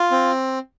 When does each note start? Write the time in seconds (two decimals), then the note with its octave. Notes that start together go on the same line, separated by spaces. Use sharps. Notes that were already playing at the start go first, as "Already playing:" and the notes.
Already playing: F4
0.11 C4